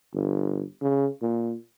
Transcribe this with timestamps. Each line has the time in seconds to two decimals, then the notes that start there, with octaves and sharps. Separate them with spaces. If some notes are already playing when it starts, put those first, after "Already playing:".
0.14 G1
0.81 C#3
1.22 A#2